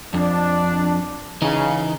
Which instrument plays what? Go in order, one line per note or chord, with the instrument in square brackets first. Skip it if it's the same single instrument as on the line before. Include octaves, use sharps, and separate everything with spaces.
[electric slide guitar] F2 [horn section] D4
[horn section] C#3 [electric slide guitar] E3 D#4